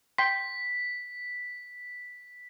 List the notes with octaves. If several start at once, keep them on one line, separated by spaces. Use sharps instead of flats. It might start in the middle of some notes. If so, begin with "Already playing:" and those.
G5 C6 B6